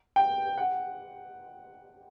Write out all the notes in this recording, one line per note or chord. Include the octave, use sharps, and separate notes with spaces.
G5
F#5